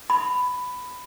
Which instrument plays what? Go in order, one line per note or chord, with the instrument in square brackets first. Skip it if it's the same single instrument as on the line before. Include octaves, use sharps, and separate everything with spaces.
[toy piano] B5